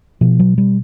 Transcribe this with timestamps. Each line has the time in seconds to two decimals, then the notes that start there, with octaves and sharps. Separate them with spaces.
0.21 B2 F3
0.40 F#3
0.58 G3